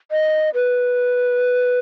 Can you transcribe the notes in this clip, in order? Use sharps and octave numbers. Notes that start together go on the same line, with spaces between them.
D#5
B4